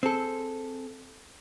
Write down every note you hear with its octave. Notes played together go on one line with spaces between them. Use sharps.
C4 G#4 A4